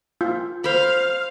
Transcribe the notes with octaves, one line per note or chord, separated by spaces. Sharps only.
F4
C5 F5 B5